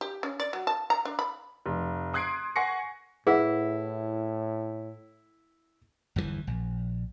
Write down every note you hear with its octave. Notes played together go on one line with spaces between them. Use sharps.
G4
C#4
D5
F#3
A5
A#5
D4
B5
F1
C6 D#6 F#6 G#6 C7 D7
F#5 G#5 C#6 A#6 C7 C#7
A2 E4 G#4 B4 F#5
G1 E2 A#2 E3
A#1